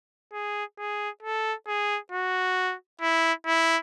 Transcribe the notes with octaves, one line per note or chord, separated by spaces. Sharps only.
G#4
G#4
A4
G#4
F#4
E4
E4